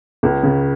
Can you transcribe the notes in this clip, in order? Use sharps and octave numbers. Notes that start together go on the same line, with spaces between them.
C#2
C#3